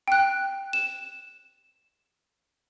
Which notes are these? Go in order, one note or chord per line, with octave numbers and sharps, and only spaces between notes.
G5 F#6
E7